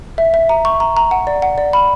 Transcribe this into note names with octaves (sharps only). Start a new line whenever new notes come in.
E5
E5
A#5
C#6
A#5
A#5
F#5
D5
F#5
D5
B5